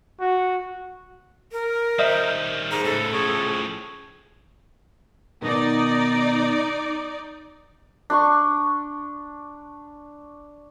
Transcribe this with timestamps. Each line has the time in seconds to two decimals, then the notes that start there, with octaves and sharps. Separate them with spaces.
0.19 F#4
1.52 A#4
1.99 D#3 G3 C5 D#5 E5
2.71 G#2 A#5
2.84 A2 C#3 A4
3.12 A2 C#3 F3
5.42 B2 D#3 D#4 D5
8.10 D4 D5 C6 C#6